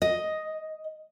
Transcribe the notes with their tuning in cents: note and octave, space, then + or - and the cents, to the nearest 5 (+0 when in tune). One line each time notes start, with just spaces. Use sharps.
D#5 +5